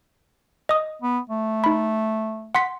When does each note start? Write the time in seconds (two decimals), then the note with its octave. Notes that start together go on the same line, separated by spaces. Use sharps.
0.69 D#5 D#6
1.02 B3
1.30 A3
1.64 D#4 B5
2.55 F#5 C6 B6